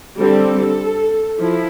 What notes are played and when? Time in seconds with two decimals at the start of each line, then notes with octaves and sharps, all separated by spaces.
0.18 D3 G3 C4 A4
1.40 F3 E4